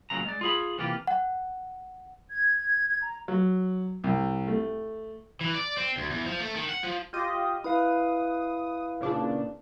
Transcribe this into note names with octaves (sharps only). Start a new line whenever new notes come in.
C#2 A#2 C#3 F#3 A#5
G#3 D5
F4 G#4 B5
C3 E3 A#3 F4 G4
F#5
G#6
A#5
F#3
C2
A3
E3
D5
C4
D2
E2
F3
A3
D#3
F#5
F3
F4 G4 D#5
E4 B4 F5 D#6
A#2 C#3 D4